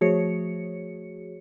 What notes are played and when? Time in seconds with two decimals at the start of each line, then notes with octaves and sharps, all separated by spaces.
0.01 F3 A3 F#4 G#4 C#5 C#7